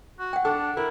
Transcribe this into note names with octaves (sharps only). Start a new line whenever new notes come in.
F#4
F#5 G5
D4 A4
E4 A#4